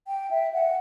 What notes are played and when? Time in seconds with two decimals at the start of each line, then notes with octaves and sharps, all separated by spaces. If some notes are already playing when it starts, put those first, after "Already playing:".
0.08 G5
0.31 E5
0.53 F#5